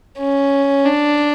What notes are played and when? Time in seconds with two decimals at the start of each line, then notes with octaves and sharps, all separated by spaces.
0.19 C#4
0.85 D4